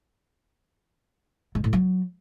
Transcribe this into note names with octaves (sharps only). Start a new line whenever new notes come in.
G#2
A2
F#3